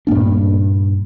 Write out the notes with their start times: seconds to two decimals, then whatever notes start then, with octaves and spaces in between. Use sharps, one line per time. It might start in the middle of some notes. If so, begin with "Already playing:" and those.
0.07 G2 A#2 A#3 D4